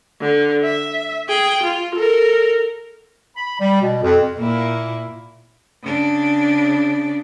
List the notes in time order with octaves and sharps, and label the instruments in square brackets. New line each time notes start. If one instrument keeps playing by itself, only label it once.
[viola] D3
E5
G#4 G5
F4
A4 A#4
[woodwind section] B5
G3
B2
F2
[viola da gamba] A#2 A#3 E4
[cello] C#3 D4